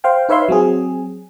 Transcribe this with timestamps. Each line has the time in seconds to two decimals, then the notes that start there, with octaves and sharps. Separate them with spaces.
0.04 C5 F5 G5
0.29 D#4 B4 C#5 E5 F5 C6
0.49 F#3 C4 G#4